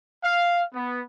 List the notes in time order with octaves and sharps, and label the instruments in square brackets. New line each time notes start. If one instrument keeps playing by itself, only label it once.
[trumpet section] F5
B3